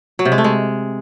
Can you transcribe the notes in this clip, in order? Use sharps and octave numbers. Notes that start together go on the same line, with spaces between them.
F#3
C3
G#3
A3
G#3